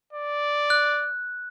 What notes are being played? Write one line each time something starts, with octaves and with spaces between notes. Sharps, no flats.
D5
F#6